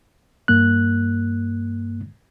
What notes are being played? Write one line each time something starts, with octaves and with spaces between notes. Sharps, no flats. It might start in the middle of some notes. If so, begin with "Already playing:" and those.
G2 A#3 F#6